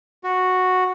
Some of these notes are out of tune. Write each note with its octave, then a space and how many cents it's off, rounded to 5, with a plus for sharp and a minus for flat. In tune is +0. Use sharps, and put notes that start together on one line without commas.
F#4 -5